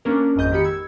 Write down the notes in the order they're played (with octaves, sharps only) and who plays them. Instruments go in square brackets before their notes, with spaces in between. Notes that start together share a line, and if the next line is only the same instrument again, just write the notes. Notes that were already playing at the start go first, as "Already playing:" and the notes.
[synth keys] A#3 C#4 D4 A#4
G#1 F2 G#2 D#5 G6
D#3 G4 B5 C#7
E6 G#6